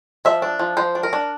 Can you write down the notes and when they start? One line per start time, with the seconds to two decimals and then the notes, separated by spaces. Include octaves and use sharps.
0.25 F3 E5
0.42 D4
0.59 F3
0.77 F3 C5
0.95 D4
1.03 A#4
1.13 D4